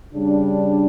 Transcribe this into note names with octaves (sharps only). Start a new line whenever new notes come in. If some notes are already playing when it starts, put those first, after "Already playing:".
C#3 G3 D4